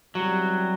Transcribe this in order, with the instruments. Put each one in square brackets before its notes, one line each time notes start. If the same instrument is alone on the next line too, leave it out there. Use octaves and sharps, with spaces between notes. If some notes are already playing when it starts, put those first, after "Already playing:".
[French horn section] E2 C3 G3 [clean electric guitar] F#3